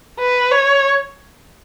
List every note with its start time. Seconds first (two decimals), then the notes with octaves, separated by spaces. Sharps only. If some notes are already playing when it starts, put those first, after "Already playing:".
0.19 B4
0.51 C#5